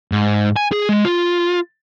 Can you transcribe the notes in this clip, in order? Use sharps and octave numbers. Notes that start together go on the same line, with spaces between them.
G#2
G#5
G#4
G#3
F4